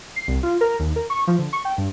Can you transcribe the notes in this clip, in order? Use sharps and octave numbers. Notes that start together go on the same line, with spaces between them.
C7
C2
F4
A#4
D#2
A#4
C#6
F3
D3
C#6
G5
G2